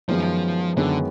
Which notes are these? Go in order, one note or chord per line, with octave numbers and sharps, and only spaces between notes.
F#2 D#3 F3 G#3 B3
F#2 D3 D#3 G#3 B3